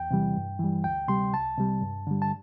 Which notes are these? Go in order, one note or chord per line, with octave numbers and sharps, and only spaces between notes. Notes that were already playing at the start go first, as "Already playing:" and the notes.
Already playing: E2 G5
C3 E3 G3
G2
E3 G3
D2 G5
C3 G3 C6
C2 A5
C3 G3
G2
D3 G3
A5